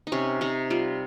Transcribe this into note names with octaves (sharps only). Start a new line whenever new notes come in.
D#4
C3 C#4
C3 D#4
G3 F4